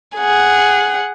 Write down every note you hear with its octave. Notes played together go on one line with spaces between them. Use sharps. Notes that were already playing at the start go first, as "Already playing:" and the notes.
G#4 F#5